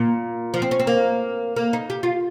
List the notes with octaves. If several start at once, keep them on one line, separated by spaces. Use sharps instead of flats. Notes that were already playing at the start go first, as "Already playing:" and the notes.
Already playing: A#2
F3
C4
C#4
C4
A#3
A#3
D#4
G4
F4